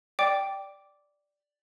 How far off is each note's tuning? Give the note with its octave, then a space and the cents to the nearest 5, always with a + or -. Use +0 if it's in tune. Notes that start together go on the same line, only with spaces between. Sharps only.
D5 +0 G5 +0 D6 -10